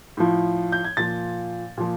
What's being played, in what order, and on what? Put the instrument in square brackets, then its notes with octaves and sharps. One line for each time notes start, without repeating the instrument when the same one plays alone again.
[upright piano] A2 F3
G6
G#6
A#2 F3 A6
A#2 F3